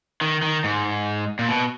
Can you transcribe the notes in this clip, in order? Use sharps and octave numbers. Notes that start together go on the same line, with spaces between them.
D#3
D#3
G#2
A#2
B2